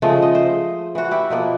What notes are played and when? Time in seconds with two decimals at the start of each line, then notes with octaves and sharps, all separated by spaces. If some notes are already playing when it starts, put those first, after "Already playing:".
0.02 C#3 F3 G#3 A3
0.22 D#5
0.35 C5
0.95 E3 F#4
1.11 E4 G4
1.30 B2 F3 A#3